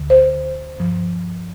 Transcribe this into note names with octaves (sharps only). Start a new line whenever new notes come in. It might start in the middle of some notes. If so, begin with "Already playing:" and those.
Already playing: D2 D3
C5
G2 F3